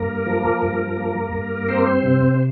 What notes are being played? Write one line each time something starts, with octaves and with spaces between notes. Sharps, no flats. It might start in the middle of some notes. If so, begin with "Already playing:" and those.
Already playing: G2 A#3 A#4
F3
G2
A#3
G2
C4 C5
C3